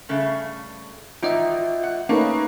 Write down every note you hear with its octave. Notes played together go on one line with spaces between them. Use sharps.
G2 C#3 A3
G#1 E3 D#4 F4 D#5 E5
F#5
A3 A#3 C#4 D#4 B4